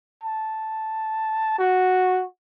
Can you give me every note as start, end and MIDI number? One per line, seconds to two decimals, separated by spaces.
0.23 1.56 81
1.58 2.24 66